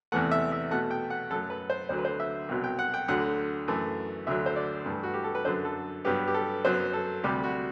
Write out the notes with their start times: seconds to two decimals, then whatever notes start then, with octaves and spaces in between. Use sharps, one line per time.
0.12 E2 C3 E3 A3 F#5
0.31 E5
0.52 E5
0.71 B2 A3 F#5
0.91 G5
1.10 F#5
1.30 F#2 F#3 A3 A4
1.50 B4
1.70 C5
1.89 D2 D3 F#3 C5
1.98 B4
2.05 C5
2.20 E5
2.49 C2 B2 F#3
2.64 G5
2.79 F#5
2.94 G5
3.08 D2 D3 F#3 F#5
3.68 F#2 E3 A3
4.27 D2 D3 F#3 E5
4.46 C5
4.56 D5
4.86 G2 E3 A3
5.03 F#4
5.14 G4
5.24 A4
5.35 B4
5.45 F#2 D3 F#3 C5
5.65 A4
6.05 G2 F#3 B3 G4
6.28 G4
6.34 A4
6.65 F#2 F#3 B3 C5
6.93 A4
7.24 D2 C3 G3 G4
7.43 F#4